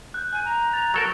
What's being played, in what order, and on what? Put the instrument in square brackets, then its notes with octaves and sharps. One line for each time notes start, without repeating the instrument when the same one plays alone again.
[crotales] F#6 G6
[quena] G#5 [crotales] F#6
[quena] A#5
[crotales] A6 F7
[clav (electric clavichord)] F#3 A4 A#4